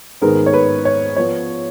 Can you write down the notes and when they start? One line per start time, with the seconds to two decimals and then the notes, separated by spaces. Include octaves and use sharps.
0.22 G#2 D#3 G#3 B3 A#4
0.46 C#5
0.54 B4
0.85 C#5
1.16 F3 B3 C#5